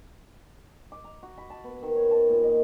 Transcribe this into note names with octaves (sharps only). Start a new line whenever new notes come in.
D6
A#5
F#4
B5
A5
B3
D#3
C#5
A5
A#2
D#5